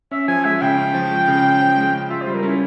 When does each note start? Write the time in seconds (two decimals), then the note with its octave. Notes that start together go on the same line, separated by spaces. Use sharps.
0.11 C#4 E5
0.28 F3 G#5
0.45 G#3 E5
0.62 C#3 G5
0.77 C#4
0.94 F3
1.11 G#3
1.28 C#3
1.43 C#4
1.61 F3
1.76 G#3
1.93 C#3
2.10 F4 E5
2.22 G3 C5
2.35 A#4
2.43 C#4 E4